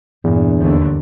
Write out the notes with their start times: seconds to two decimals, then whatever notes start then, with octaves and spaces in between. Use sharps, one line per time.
0.24 E2 G2 A#2
0.59 D#2 D3